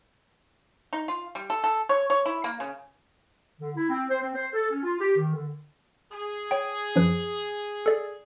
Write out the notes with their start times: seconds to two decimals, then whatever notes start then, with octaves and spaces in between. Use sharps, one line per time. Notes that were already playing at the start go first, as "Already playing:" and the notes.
0.93 D#4
1.08 F4
1.35 G3
1.50 A4
1.64 A4
1.89 C#5
2.10 C#5
2.26 E4
2.44 A#3
2.60 C#3
3.60 D3
3.76 E4
3.89 C4
4.09 C5
4.21 C4
4.35 C5
4.53 A4
4.71 C#4
4.83 F4
5.00 G4
5.16 D#3
5.34 D3
6.12 G#4
6.51 C#5 G5
6.96 F#2 F3 B4
7.86 A4 D5